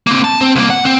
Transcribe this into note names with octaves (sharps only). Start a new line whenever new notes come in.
A#3 C4
A5
C4
C2 A#3
F#5
C4